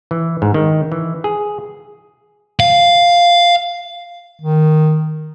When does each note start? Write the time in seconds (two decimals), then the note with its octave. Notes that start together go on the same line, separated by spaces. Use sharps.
0.11 E3
0.42 G#2
0.54 D#3
0.92 E3
1.24 G#4
2.60 F5
4.42 D#3